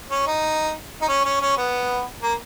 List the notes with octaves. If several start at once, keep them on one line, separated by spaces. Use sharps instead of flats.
C#4
D#4
D#4
C#4
C#4
C#4
B3
A#3